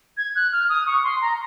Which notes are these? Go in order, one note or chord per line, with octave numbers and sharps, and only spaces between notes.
G#6
F#6
F6
D#6
C#6
C6
A#5